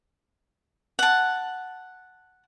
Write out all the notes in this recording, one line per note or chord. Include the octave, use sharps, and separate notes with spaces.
F#5 A5